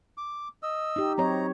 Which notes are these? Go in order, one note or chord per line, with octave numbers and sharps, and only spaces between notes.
D6
D#5 E6
D#4 G4
F#3 C4 D#4 C#5 A#5